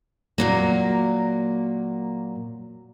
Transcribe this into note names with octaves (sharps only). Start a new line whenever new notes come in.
A#2 F#3 A#3